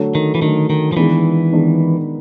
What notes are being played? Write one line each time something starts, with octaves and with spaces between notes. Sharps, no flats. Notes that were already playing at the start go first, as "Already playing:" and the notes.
Already playing: D3 F#3 A3
D#3
E3
D3 D#3 F#3 A3
D#3
F3
D#3 E3 G#3 B3 D4
D#3 G#3 B3 D4